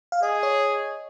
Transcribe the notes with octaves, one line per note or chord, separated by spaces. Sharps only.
F5
G#4 D#5
C#5